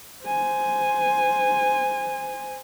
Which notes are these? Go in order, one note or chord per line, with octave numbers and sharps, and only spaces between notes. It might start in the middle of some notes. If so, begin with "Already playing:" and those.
C5 G#5